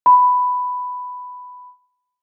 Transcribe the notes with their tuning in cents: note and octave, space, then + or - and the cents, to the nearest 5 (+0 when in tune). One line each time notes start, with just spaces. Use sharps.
B5 +10